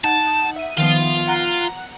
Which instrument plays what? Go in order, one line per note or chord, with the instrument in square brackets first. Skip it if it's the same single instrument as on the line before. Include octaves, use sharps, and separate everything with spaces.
[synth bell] D#4 F#5 [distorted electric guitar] A5
[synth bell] E5 D#7
[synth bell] D#3 F3 B3 [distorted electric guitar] F4
[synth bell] F#5 A#5 F#6